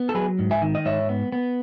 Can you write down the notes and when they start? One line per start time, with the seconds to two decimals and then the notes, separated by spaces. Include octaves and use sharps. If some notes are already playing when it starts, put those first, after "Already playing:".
Already playing: B3
0.09 A4
0.14 F#3 G#4 B4
0.39 G#2
0.51 E5 G#5
0.62 D#3
0.75 D#5
0.85 G#2 C#5 E5
1.09 B3
1.32 B3